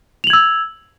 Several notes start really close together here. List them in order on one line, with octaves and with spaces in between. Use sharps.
F7 F#7 G#6 E6